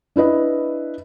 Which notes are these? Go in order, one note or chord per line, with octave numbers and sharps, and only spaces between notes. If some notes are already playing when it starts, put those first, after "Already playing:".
D4 E4 B4 D#5